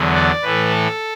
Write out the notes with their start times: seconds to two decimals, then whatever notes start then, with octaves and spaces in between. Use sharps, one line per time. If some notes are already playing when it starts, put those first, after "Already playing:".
Already playing: E2 D3 F#3 B3
0.14 D5
0.42 A2 E3 A3 B4
0.71 A4